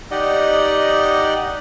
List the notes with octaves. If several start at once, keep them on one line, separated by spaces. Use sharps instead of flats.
D#4 G4 D5 D#5 F#5